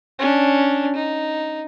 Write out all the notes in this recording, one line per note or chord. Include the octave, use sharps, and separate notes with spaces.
C#4 D4
D#4